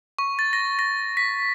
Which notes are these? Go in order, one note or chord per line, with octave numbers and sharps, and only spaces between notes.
C#6
A6
A#6
A#6
B6